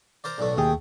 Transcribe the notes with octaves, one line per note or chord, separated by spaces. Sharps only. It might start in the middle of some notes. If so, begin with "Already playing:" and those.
A#4 C5 D5
B1 A2 A3 D5
D#2 A3 G#4 G5